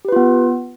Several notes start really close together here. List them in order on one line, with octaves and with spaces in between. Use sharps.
G4 B4 F4 B3